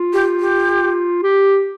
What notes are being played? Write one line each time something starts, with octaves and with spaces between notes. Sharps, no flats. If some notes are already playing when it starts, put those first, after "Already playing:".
Already playing: F4
G4
G4
G4